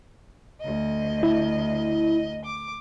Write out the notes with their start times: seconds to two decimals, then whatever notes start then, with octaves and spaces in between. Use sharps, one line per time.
0.60 D2 D#5
1.23 E4
2.43 D6